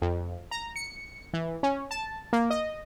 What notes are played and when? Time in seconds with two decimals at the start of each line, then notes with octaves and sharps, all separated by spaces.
0.02 F2
0.51 A#5
0.76 C#7
1.34 E3
1.63 C#4
1.91 A5
2.33 A#3
2.50 D#5